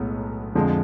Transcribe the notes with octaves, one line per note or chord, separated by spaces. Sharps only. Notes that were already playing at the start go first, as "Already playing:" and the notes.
Already playing: B1 A2 G#3 B3
F2 D3 F3 G#3